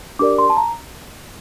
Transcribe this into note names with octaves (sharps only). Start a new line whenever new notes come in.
D4 G4 A#4 D5 D6
C6
A5
A#5